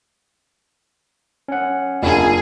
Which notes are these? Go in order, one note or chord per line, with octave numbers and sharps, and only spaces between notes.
C#4 F#5
F#1 D4 F4 G#4